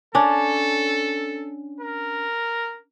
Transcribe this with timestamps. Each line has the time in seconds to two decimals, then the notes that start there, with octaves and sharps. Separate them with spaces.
0.15 C#4 D4 A4
1.80 A#4